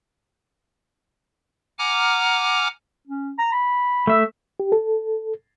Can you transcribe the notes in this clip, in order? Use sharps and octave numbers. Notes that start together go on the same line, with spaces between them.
F#5 G#5 A#5 D6 F6
C#4
A#5
B5
A3 E5
G4
A4